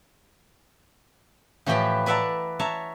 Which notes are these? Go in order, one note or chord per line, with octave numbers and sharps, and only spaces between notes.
A2 E3 F3 G4 B4 G5
B4 D5 E5 F#5 A5 A#5
C#5 E5 A5 A#5